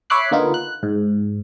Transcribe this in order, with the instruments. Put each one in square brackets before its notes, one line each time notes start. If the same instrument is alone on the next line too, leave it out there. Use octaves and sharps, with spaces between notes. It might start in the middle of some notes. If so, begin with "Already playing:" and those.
[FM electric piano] C#5 E5 B5 D6 F#6 C7
D3 A#3 B3 D#4 F4
F#6
G#2